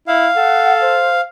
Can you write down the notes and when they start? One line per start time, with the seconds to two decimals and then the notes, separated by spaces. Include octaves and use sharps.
0.08 E4 F5
0.36 A4 F#5
0.81 C5